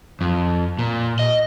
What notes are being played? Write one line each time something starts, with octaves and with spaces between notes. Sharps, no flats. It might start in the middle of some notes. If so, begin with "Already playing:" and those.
F2
A#2
D#5